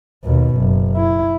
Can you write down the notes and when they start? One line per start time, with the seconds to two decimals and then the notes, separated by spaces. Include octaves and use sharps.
0.25 D#2 B2
0.57 F#1
0.96 E4